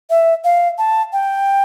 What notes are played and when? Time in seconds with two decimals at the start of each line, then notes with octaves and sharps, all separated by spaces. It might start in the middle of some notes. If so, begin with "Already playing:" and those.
0.10 E5
0.44 F5
0.78 A5
1.13 G5